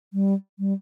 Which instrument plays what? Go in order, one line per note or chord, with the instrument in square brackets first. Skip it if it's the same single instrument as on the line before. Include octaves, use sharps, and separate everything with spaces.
[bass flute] G3
G3